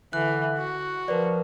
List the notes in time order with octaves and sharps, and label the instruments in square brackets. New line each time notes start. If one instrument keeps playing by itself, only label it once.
[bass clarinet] D3 [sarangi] E3 [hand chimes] F#6
[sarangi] F#4
[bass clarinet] F3 [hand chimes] A#4 B4 D5